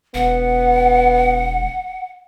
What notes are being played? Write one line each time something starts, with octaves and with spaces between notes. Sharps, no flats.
E1 B3 F#5